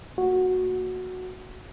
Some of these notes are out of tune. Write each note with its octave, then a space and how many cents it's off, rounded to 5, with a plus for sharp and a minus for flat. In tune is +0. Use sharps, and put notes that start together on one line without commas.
A#3 -25 F#4 -5